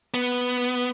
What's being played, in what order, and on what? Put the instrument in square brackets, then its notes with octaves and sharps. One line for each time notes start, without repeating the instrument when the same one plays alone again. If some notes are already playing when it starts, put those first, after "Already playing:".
[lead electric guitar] B3